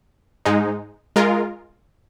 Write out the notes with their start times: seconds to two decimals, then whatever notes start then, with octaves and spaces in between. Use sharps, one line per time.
0.46 G#2 G#3 D#4
1.16 G#3 F4 A#4